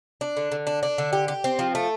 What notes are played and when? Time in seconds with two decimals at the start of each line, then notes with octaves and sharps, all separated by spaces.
0.21 D4
0.37 D3
0.52 D3
0.67 D4
0.83 D4
0.98 D3
1.13 G4
1.28 G4
1.44 C4
1.59 F3
1.75 A3